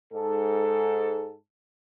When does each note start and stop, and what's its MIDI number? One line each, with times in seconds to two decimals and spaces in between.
0.11 1.35 44
0.11 1.35 69